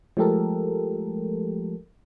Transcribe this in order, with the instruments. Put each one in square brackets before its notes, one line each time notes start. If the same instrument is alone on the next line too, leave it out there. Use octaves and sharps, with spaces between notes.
[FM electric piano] F3 G#3 A3 G4 A4 A#4